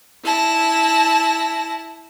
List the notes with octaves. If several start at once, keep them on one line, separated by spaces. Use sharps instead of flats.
E4 A5 A#6